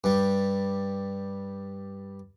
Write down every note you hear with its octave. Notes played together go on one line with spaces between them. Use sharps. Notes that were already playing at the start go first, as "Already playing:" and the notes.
G2 G3